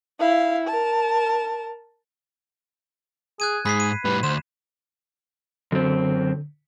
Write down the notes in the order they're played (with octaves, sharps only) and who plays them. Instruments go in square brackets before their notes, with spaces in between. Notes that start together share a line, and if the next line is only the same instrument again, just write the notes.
[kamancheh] E4 F5
A#4 A5
[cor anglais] G#4 [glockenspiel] F#6 G#6 D#7
[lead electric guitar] G#2 [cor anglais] G#4 [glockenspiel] B5 B6 C7
[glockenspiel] D#7
[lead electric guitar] A2 G3 [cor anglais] B4
[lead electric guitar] D2 [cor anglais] C5 [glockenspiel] E7
[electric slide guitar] F#2 C4 [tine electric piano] D3